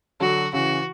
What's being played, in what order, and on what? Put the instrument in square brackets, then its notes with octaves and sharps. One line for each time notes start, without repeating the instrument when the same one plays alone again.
[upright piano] D3 F#3 [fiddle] F#4
[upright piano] C#3 E3 [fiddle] F#4